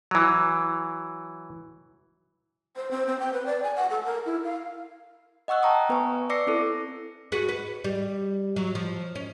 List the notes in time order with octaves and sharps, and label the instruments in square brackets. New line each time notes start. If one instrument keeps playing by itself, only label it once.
[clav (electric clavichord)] E3 F#3
[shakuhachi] C5
C4
C4
G5
B4
D5
G#5
F#5
A4
A#4
E4
F5
[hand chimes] D#5 F#5 C#6 E6 F#6
G5 A5 A#5 C#6 D#6
B3 B4 G#5 C#6
D5 D6 E6 A#6 C7 C#7
C4 E4 A4
[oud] F#4 G#4 B4
B4
G3
F#3
F3
C#4